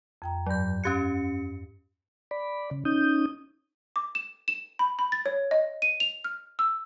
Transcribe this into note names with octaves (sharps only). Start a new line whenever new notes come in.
F2 G5 A#5
G2 F#3 D5 G6
C#4 G4 F5 F#6 G#6 C#7
D5 B5
C#3
C#4 D#4 D#6 G6
D6
E7
E7
B5
B5
A6
C#5
D#5
D#7
F7
F6
E6